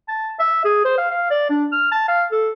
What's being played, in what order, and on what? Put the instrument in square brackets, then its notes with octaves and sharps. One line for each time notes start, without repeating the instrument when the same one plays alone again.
[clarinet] A5
E5
G#4
C5
F5
F5
D5
D4
F6
A5
F5
A4